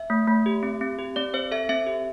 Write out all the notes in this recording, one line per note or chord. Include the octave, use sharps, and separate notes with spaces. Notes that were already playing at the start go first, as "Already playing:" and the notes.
Already playing: E5
A3
A3
G4
C4
C4
G4
C4 D5
C4 C5
A4 E5
C4 E5
G4